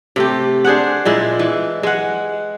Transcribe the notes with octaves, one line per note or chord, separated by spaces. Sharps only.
C3 A3 G4
D4 G#4 C5 F#5
A#2 G#3 E4
E3
G#3 F#5